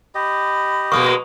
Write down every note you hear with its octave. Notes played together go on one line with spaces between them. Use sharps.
G4 D#5 B5
B2 G#3 A#3 C#6 D#6